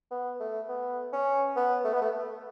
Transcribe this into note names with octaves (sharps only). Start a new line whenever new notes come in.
B3
A3
B3
C#4
B3
A3
B3
A3